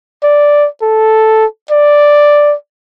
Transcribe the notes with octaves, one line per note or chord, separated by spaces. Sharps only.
D5
A4
D5